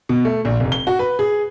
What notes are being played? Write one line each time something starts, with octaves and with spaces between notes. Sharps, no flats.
B2
A3
A#1
F1
G7
F#4
B4
G#4